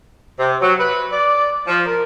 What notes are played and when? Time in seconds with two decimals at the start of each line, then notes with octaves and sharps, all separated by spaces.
0.39 C3
0.61 F#3
0.79 B4
1.12 D5
1.67 F3
1.86 A#4